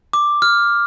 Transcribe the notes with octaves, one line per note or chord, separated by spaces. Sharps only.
D6
F6